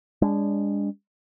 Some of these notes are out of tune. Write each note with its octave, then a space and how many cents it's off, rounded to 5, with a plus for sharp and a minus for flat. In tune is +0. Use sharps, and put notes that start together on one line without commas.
G#3 -35 D4 -25